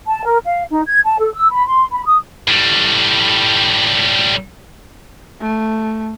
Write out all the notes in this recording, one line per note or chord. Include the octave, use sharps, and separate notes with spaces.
A5
A#4
F5
D#4
G#6
A5
A4
E6
B5
C6
B5
D#6
A2 G3
A3